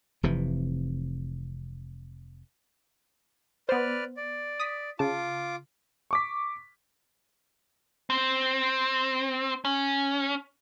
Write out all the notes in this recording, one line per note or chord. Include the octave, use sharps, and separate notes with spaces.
F1 C3 E3
B3 B4 C5 D5 F6
D5
D#6 B6
C#3 F4 A5 D6
C#6 D6 B6
C4
C#4